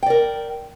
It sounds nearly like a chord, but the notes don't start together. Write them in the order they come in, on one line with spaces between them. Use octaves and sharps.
G5 D5 A#4